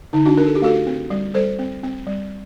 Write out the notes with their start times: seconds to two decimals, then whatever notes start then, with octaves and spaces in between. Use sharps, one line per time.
0.13 D3 D#4
0.26 D4 F#4
0.37 D4 A#4
0.46 A4
0.55 G4
0.62 A3 F#4 A4
0.87 C4
1.10 G3
1.34 G3 A4 C5
1.59 C4
1.83 C4
2.07 G3